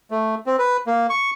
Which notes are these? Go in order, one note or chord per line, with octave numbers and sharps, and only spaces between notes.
A3
C4
B4
A#3
C#6